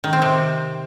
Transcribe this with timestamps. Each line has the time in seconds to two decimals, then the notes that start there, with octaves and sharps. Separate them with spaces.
0.04 D#3
0.13 C4
0.22 C3